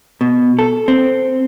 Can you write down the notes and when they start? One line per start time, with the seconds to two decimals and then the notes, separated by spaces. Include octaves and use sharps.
0.21 B2
0.59 A4
0.88 C4